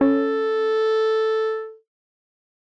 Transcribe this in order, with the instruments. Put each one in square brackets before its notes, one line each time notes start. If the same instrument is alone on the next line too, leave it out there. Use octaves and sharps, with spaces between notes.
[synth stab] C#4 [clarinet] A4